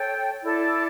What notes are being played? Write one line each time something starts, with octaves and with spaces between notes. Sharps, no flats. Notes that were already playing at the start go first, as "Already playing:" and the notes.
Already playing: A4 C#5 G5
E4 A4 D5